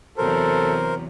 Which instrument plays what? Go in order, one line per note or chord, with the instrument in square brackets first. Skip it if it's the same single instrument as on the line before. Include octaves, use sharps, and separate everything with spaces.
[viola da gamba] E2 C3 F#3 [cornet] A4 [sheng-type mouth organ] A#4 C5